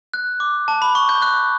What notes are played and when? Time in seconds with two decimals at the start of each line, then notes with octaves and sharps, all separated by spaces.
0.14 F#6
0.40 D6
0.68 A5
0.82 B5
0.95 C#6
1.09 G6
1.22 F#6